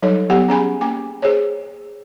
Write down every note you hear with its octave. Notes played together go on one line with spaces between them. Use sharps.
F#3 G3 D#4 A4 C#5
F#3 B3 G4 F#5
C#4 G#4 G#5 B5
A#3 C#4 G#5 D6
G#4 C5 C#5